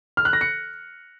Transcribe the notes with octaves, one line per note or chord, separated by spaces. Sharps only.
F6
F#6
A#6
C#7